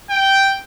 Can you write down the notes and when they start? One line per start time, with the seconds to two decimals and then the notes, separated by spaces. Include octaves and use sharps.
0.10 G5